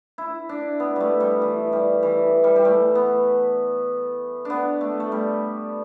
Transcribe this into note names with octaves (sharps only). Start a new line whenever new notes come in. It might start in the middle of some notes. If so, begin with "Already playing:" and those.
E4
D4
B3
G3 A3
G3
E3
G3
E3
G3
G3
A3
B3
B3 D4
A3
A3
G3